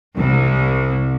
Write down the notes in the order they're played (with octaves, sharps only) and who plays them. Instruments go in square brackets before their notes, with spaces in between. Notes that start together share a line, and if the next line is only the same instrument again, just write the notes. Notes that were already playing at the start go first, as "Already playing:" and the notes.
[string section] C2